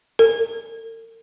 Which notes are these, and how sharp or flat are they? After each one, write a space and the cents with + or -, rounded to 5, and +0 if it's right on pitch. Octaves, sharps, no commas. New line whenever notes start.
A#4 -45